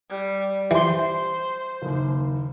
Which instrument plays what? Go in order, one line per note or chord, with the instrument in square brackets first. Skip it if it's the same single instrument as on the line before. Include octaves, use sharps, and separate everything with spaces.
[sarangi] G3
[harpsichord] E3 [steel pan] G4 C6 [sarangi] C5
[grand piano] F#1 D#2